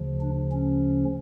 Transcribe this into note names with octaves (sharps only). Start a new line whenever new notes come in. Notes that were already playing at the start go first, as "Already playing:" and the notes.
Already playing: D2 C#3 F3
D4
C#4